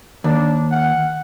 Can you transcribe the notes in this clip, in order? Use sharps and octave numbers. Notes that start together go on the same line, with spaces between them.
D#2 D4
F#5